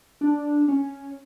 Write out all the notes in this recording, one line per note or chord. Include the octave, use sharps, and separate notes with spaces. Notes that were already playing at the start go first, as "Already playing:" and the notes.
D4
C#4